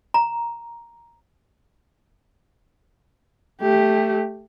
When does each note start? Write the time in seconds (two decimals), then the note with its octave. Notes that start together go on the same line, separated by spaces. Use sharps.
0.14 A#5
3.61 A3 G4